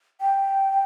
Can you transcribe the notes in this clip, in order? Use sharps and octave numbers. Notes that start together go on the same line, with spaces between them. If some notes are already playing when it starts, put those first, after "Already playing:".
G5